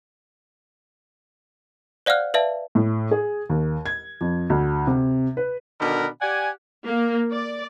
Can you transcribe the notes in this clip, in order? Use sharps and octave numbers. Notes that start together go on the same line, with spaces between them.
C5 D5 F5 F#5 F6 F#6
B4 D5 E5 F5 A5
A2
G#4
D#2
G#6
F2
D2
C3
B4
B2 D3 D#3 D4 A#4 B5
G4 D5 F#5 G#5
A#3
D5